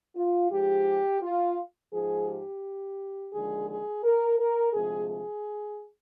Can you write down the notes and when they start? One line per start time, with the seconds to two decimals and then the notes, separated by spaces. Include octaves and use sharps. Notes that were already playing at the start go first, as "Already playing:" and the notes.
0.16 F4
0.51 G#2 F3 G#3 G4
1.22 F4
1.92 G#2 F3 G#3 G#4
2.28 G4
3.33 D#2 D3 F3 G#3 G#4
3.69 G#4
4.04 A#4
4.39 A#4
4.74 D2 C3 F3 G#3 G#4
5.09 G#4